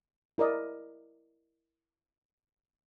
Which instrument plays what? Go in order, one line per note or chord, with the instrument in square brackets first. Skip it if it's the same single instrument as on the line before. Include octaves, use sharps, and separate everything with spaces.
[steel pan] E4 A#4 D5 D#5